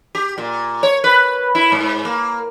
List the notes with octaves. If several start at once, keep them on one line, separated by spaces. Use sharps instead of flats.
G4
A#2
C#5
B4
E4
G#2
A#3